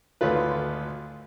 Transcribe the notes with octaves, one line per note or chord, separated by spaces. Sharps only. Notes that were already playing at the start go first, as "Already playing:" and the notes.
G#1 D2 A3 F4 B4